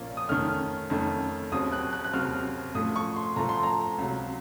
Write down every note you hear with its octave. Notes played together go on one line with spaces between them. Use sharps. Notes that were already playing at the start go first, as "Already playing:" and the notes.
Already playing: A#1 A#2 F3 A#3 C#4
D#6
F2 D#3 A3 C#4 F6
F2 D#3 A3 C#4
D#2 C#3 F#3 C4 D#6
F#6
F#6
F#6
D#2 C#3 F#3 C4 F6
A2 F3 A3 D#6
C#6
C6
A2 F3 A3 A#5
C6
A#5
C#2 C3 F#3